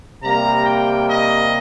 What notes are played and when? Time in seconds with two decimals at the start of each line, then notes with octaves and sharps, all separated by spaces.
0.22 C3 G3 A#3 A#5
0.65 G5
1.08 D#5